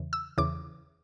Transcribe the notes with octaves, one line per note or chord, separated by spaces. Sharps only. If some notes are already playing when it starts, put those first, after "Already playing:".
Already playing: E2 C#3 E3
E6
E2 C#3 E3 D6